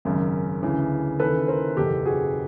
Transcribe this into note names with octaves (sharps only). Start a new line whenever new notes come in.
G#1 F#2 C#3
D2 C#3 E3
D#2 C#3 E3 A4 B4
A#4 C5
F#1 E2 B2 G4 A4
F#4 G#4